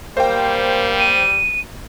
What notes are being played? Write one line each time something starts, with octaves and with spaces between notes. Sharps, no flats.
G3 A#3 C5 G5
D#7